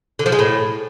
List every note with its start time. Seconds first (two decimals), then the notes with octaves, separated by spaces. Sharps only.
0.19 D3
0.26 F3
0.32 G#3
0.39 A2